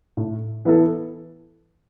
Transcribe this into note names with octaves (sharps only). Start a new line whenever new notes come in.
A2
E3 B3 E4 A4